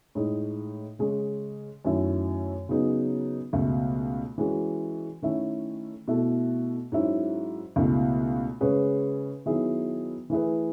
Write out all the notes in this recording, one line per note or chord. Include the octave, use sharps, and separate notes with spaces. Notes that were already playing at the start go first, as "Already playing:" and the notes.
A2 G#3 D#4
C#3 G#3 C#4
F#2 D#3 F#3 A3 E4
C#3 F#3 B3 D#4 G#4
C#2 B2 A3
E3 G#3 C#4 F#4
D#3 A3 C#4 E4
B2 A3 E4 A4
G#2 F#3 C#4 E4
C#2 B2 A3 E4
C#3 G#3 C#4 G#4 B4
D#3 F#3 B3 E4 G#4
E3 A3 E4 G#4 B4